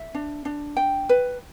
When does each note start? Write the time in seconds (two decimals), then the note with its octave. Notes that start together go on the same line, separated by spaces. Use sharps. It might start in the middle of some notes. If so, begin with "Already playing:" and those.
Already playing: E5
0.15 D4
0.45 D4
0.77 G5
1.09 B4